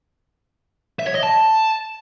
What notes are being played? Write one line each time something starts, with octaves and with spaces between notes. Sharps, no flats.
E5
C#5
D#5
A5